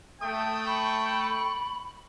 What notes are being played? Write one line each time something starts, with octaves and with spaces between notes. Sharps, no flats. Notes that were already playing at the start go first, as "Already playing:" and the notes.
A3 G5 D#6
B5 C#6